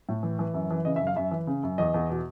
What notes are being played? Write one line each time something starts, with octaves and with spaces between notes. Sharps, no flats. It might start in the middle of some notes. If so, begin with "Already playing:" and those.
A2
E3
E3
F#2
E3
C#3 D#5
E5
F#2
F5
F#2 E5
E3
C#3
F#2
E2 D#5
E2
B2